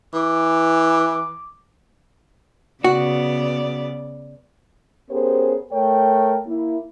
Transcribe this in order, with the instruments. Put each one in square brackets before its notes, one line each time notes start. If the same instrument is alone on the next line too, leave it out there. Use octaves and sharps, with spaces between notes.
[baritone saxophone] E3 [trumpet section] D6
[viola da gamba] C#3 B3 D5 [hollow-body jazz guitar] F#4
[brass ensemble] B3 C#4 G4 G#4 A#4 C5
A3 A#4 C#5 G5
A#3 E4